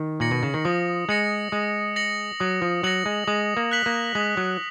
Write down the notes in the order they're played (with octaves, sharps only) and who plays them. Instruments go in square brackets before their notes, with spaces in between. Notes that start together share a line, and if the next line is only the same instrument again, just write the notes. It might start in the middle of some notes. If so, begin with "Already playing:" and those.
Already playing: [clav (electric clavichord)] D#3
[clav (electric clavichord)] A#2 [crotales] A#6 C#7 F#7
[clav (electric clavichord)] B2
C#3
D#3
[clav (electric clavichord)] F3 [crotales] D#6
[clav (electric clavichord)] G#3 [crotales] A#6 C#7 F#7
[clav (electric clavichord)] G#3 [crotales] D#6
[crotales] A#6 C#7 F#7
[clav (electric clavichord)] F#3 [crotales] D#6
[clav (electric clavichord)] F3
[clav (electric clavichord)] F#3 [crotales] A#6 C#7 F#7
[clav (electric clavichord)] G#3
[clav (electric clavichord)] G#3 [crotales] D#6
[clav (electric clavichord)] A#3
[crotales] F#6 B6 F#7
[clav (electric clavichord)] A#3
[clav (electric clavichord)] G#3 [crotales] D#6
[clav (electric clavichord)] F#3